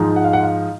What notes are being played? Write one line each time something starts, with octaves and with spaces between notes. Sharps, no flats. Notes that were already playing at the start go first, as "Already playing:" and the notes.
Already playing: G#2 F3 G#3 D#4
F#5
F5
F#5
F5